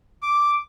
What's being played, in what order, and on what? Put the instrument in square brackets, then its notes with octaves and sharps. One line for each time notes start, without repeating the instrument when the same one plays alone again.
[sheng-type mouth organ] D6